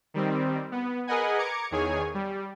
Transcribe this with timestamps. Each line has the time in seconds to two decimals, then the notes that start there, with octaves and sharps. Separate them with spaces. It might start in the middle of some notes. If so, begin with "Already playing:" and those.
0.14 D#3 G3 C4
0.72 B3
1.07 G#4 A#4 B4 D#5 F#5 G#5
1.38 A#5 D6 G#6 C#7
1.71 E2 D#3 G#4 C#5 G#5
2.14 G3